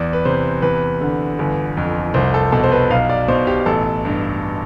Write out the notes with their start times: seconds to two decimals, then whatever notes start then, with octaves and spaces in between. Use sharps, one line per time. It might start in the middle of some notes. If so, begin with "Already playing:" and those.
Already playing: E2 D5
0.13 B4
0.25 C3 C5
0.62 E2 B4
1.01 D3
1.39 G1
1.77 F2
2.14 C2 C5
2.34 A4
2.52 B2 A4
2.63 C5
2.72 B4
2.90 B1 F5
3.09 D5
3.28 B2 C5
3.47 G4
3.66 A1 A4
4.05 G2